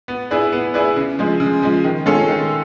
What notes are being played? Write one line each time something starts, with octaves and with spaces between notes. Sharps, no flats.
B3
E4 G#4 B4 D5
B3
E4 G#4 B4 D5
C#3
F3 G#3
C#3
F3 G#3
D#3
G#3 C#4 F4 A4
D#3